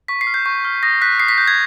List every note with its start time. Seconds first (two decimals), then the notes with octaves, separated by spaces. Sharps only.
0.08 C#6 B6
0.21 C7
0.27 F6
0.34 G6
0.46 C#6
0.65 F6
0.83 D#6 A#6
1.02 F#6 B6
1.20 D#6 C7
1.29 B6
1.38 F#6 G6
1.48 G#6